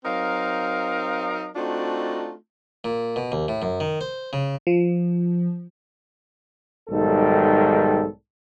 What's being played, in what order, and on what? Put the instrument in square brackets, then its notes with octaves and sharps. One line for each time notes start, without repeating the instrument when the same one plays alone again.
[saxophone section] F#3 C4 D#4 A#4 F5
A3 C4 D4 D#4 F4 F#4
[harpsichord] A#2
B2
D#2
A2
F#2
D#3
C5
C#3
[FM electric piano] F3
[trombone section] B1 G#2 D#3 G3 A4